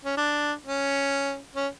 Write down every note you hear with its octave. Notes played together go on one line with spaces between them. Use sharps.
C#4
D4
C#4
C#4